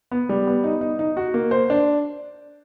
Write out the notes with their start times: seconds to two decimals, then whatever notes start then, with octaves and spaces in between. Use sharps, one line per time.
0.11 B3
0.29 G3
0.47 B3
0.64 D#4
0.81 D#4
0.99 D#4
1.17 F#4
1.34 A#3
1.51 C5
1.70 D4